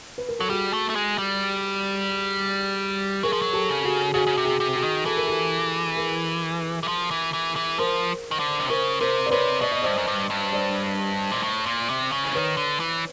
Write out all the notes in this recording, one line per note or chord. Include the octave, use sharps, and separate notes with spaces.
B4
A#4
F#3 A4
G3 F#4 G#4
A3
A3
G#3
G3
F#3 G#4 A#4
F3
F#3
G4 A4
C#3
F#4 G#4
C#3 F#4 G#4
C#3
C3
F#4 G#4
C3
F#4 G#4
D#3
E3 A4
A#4
G4 A4
G#4 A#4
E3
F3
E3
E3
E3
F3 A#4 C5
D#3
D3
C3
C#3 A#4 C5
C3 A#4 C5
D5
C3 B4 C#5
B2 D5
D#5
G2 C5 D5
F#2
G2
G2
C5 D5
A#2
A2
A#2
C3
C#3
E3
D#3 B4 C#5
D3
E3